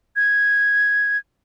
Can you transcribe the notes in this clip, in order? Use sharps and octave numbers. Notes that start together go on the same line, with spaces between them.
G#6